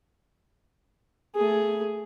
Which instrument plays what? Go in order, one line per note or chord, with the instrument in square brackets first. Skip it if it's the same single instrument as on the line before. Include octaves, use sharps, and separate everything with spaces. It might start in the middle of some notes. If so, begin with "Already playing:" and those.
[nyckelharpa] A3 G#4